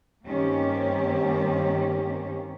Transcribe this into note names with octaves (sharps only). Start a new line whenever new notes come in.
G2 D#3 A#3 C4 C#4 G4